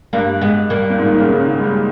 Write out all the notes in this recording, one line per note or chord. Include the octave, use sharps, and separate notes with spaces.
G2 G3 A#3
G#3 B3
G3 A#3
A#2
G#2
D#3
C#3
C#3
D#3
G#3
G3